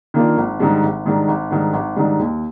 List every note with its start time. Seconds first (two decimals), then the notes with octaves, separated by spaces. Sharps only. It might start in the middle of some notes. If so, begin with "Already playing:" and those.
0.14 D#3 A#3 D4 F4
0.37 G#1
0.59 G#2 D#3 G3 D4
0.83 G#1
1.05 G#2 D#3 G3 D4
1.28 G#1
1.50 G#2 D#3 G3 D4
1.73 G#1
1.96 G#2 D#3 G3 D4
2.19 D#2